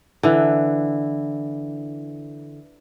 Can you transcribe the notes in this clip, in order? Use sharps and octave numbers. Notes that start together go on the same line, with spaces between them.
D3 E3